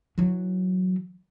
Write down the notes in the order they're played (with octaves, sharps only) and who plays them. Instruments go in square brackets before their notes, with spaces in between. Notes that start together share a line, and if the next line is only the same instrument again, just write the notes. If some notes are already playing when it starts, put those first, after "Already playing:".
[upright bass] E3 F#3